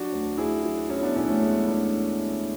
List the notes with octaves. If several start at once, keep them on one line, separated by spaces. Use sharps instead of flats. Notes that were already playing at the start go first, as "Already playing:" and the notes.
Already playing: F#3 D4 F#4
D2
D2 E4 G#4
F#3
F#3 C#4 E4
B3 D4
D3 C#4 E4
A3 C#4
D2 G#3 B3
B3 D4